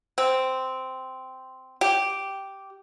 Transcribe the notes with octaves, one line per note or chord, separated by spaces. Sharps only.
C4
G4